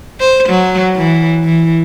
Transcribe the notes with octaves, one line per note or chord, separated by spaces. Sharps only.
C5
F#3
E3
E3